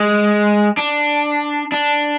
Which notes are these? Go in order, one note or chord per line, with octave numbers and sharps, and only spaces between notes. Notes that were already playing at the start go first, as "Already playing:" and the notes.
Already playing: G#3
D4
D4